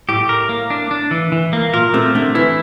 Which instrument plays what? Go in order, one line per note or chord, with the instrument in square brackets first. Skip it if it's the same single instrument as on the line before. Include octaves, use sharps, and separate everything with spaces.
[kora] A2 [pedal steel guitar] G4
[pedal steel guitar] A#4
A#3
D4
D4
E3
E3
A#3
[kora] A#2 [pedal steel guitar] A#4
[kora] C3 [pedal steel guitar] A3
[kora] D3 [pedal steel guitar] A3
[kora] E3 [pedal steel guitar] E4